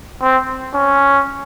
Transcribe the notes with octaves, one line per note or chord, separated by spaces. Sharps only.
C4
C#4